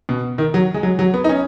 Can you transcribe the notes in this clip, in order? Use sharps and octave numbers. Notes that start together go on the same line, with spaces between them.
B2
D#3
F#3
G#3
F#3
F#3
B3
D#4
C#4